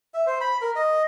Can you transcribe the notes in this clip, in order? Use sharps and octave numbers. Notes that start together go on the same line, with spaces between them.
E5
C5
B5
A#4
D#5